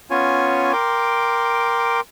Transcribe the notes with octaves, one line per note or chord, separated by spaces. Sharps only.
B3 C#4 F4 C#5 G#5
A#4 G5 C6 D6